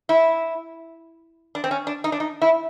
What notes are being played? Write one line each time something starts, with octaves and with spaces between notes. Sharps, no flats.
E4
D4
C4
C#4
D4
D#4
D4
D#4
E4